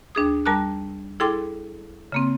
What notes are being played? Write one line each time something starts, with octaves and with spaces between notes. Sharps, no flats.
D#2 D4 G#4 D#6
G3 A#4 A5 A#5 D6 F#6
E4 G#4 A4 G5 C6 D6
C#3 A#3 C4